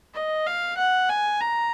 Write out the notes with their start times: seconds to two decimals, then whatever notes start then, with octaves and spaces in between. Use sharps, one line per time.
0.14 D#5
0.47 F5
0.78 F#5
1.09 G#5
1.41 A#5